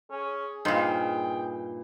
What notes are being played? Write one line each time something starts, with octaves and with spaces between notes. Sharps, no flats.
C#4 G#4
G2 A#2 D#4 C5 G5